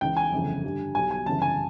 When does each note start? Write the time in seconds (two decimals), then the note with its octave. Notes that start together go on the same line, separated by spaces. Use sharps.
0.01 C#2 C#3 E3 G5
0.17 G#5
0.32 G1 F2 C#3 E3
0.63 G2 D3 G3
0.95 B1 B2 G3 G#5
1.11 G#5
1.26 G1 F#2 C#3 E3 A5
1.42 G#5